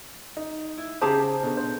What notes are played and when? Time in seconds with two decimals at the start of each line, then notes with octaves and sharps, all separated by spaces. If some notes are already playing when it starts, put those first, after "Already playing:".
0.37 D#4
0.78 E4
1.02 C#3 G4 G#4 C5 A5 A#5
1.43 B2 D3
1.57 C5